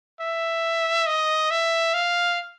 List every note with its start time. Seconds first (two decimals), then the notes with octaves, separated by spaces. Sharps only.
0.20 E5
1.07 D#5
1.50 E5
1.94 F5